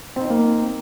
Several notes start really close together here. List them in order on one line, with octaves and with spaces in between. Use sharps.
C4 D#4 C5 A#3